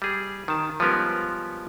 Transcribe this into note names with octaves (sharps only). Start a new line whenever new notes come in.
G3 G#4
D#3 A5
F3 G3 G#3 B3 C#4 A#4